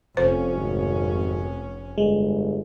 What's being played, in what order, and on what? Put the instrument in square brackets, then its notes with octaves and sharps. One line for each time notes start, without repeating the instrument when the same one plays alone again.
[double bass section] F1 C#4 [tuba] F2 [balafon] C5
[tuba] G#1
[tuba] G1 [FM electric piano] G#3